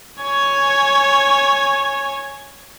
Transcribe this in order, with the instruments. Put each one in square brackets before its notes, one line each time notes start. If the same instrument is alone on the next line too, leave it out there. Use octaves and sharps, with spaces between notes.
[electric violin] C#5 G#5